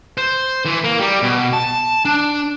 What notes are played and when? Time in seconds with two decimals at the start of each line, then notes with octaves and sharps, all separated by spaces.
0.18 C5
0.65 E3
0.84 A#3
0.99 G3
1.23 B2
1.53 A5
2.05 D4